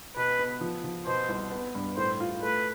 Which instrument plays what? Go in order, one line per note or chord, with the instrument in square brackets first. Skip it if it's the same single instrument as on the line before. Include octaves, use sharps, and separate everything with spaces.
[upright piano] B2 [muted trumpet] B4
[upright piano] B3
F3
F3
[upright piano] B2 [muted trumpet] C5
[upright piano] C2
B3
G2
[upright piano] A2 [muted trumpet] C5
[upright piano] F4
[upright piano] A3 [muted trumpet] B4